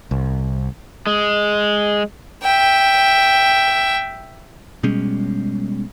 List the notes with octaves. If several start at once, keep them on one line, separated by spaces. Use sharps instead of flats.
C2
G#3
E5 G5
B2 G3 G#3 C#4